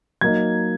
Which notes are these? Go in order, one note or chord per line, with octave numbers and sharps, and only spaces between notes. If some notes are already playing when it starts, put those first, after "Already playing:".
F#3 A#3 D#4 G#6